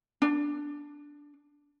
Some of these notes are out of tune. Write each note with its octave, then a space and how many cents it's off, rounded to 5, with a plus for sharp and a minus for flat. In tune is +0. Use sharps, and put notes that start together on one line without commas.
D4 -10